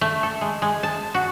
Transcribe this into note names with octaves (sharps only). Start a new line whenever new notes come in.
A3
A4
G#3
G#3
A5
F#4